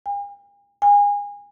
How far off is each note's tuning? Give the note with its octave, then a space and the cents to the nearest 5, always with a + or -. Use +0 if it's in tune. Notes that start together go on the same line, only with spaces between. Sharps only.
G#5 -45
G#5 -30